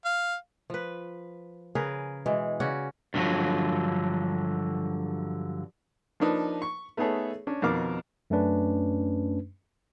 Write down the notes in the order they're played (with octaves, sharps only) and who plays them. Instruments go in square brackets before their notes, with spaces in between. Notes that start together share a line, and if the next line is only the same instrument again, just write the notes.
[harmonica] F5
[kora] F3 B4
C#3 G#4 A#4 B4
B2 E3 G#3
C#3 C#4 F#4 D5
[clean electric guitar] G2 A#2 D3 D#3 F3 F#3
[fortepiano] F3 A#3 D4 D#4 B4
C#6
A3 B3 D#4 G#4 A4 C#5
C#4 D4
F2 B2 D#3 A#4 F5 D6
[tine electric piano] F#2 A3 C#4 D4 B4